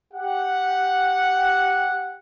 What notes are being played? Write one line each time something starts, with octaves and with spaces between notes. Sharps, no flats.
G4 F#5